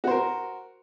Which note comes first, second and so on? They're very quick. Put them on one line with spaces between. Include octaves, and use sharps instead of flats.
F#4 C5 A#4